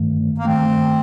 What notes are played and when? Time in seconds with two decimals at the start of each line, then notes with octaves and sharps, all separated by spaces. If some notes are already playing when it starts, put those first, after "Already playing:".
Already playing: G2 D#3 A3
0.38 A#3
0.45 G2 D#3 A3 C4